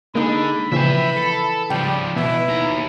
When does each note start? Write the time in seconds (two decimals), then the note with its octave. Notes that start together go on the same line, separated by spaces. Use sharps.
0.15 D3 G#3 A#3 D#4 B5
0.72 A#2 C#3 E3 F3 E5 G5
1.16 A4
1.70 C#2 F3 G3 G5
2.16 B2 E3 B3 E4
2.48 D#2 A#5